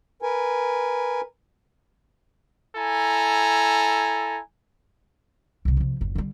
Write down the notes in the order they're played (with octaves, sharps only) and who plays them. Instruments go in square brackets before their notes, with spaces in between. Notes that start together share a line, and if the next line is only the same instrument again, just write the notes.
[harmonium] A#4 B4 G#5
[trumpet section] E4 A4 G#5 A#5
[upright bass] C2 C3
C3 F3
F#1 D2
D3 G3